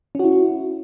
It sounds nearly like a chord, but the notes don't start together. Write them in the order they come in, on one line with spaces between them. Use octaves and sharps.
C#4 F#4 E4